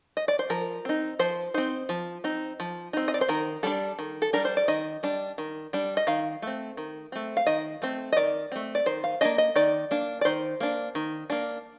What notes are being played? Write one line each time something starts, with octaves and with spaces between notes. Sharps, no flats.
D#5
D5
C5
F3 A#4
C4 D#4
F3 C5
C4 D#4 C5
F3
C4 D#4
F3
C4 D#4
D#5
D5
C5
D#3 A#4
G3 D4 A4
D#3
A4
G3 D4 A#4
C5
D5
D#3 D#5
G3 D4
D#3
G3 D4
D#5
D#3 F5
A3 C4
D#3
A3 C4
F5
D#3 D#5
A3 C4
D#5
D#3 D5
A3 C4
D5
D#3 C5
F5
A#3 D4 D#5
D#5
D#3 D5
A#3 D4
D5
D#3 C5
A#3 D4
D#3
A#3 D4